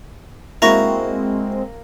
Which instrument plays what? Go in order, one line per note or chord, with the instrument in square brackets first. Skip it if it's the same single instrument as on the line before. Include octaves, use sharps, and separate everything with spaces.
[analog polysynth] G#3 C4 [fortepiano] A#3 [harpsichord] E4 F#4 [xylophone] A#5 C#6 A#6